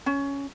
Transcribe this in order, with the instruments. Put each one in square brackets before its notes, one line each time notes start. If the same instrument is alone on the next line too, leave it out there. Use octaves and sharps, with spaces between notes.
[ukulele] C#4